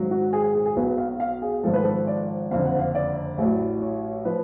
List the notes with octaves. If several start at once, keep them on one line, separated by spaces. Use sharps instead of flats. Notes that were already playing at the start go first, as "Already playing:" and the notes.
Already playing: G#1 G#2 F#3
F#4
G#4
G#4
G#4
G#4
B1 B2 F#3 B4
F5
F5
G#4
G#1 G#2 F3 A4
B4
A4
D5
F#1 F2 D3 F5
F#5
F5
D5
A1 A2 F#3
C#5
F3 B4